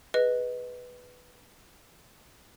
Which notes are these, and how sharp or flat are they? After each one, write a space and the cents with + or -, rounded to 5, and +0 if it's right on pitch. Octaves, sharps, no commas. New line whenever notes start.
G#4 -5 B4 +0 D#5 +0